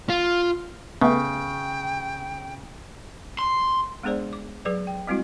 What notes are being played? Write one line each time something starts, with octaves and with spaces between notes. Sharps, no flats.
F4
C#3 A3 B3 G5
C6
G#3 B3 D4 G#4 C5 D5
D6
F#3 G#4 B4 D5
G5
G3 G#3 C4 E4 F#4